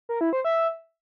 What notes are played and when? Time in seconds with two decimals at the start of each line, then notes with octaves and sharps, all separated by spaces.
0.09 A#4
0.21 E4
0.33 C5
0.45 E5